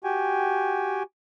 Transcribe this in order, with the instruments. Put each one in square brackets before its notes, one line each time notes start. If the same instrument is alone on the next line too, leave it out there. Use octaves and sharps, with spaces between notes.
[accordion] F#4 G4 G5 G#5